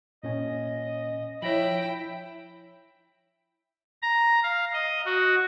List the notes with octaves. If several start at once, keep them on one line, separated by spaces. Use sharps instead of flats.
A#2 C#4 D#5 G#5
F3 E4 C#5 G5 B5 A#6 F#7
A#5
F5
D#5
F#4